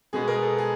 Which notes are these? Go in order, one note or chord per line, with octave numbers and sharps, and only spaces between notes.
B2 G#3 B3 G#4
A#4
A4
G#4